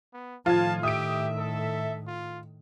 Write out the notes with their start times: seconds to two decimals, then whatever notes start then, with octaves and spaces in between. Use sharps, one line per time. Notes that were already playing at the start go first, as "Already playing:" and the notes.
0.13 B3
0.46 A2 D#3 F3 F4 A5 G#6
0.83 G4 E5 D#6 D7
1.38 A4
2.07 F4